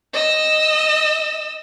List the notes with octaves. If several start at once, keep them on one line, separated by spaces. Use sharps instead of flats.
D#5 E6